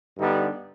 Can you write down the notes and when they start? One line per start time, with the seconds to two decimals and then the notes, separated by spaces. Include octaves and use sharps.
0.18 G2 D3 G3 B3 D#4